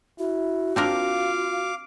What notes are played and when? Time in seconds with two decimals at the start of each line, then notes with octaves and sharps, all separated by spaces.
0.19 E4 F#4
0.76 C4 D4 F4 A#4 F5 D6